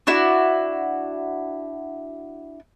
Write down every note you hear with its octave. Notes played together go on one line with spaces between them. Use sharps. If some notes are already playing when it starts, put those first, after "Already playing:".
D4 E4 F#4